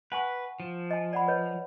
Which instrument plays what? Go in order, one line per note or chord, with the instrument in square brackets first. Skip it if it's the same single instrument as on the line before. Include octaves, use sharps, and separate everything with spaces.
[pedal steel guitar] B4 [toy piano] F#5 G#5 C#6
[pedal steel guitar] F3
[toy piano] D#5 G#5
D5 F#5 B5
B4 C#5 D#5